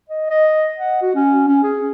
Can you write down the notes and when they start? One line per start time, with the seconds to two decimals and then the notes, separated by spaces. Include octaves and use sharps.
0.10 D#5
0.31 D#5
0.77 F#5
1.02 F#4
1.15 C#4
1.48 C#4
1.64 G#4